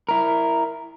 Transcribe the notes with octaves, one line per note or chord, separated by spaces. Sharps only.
E4 A#4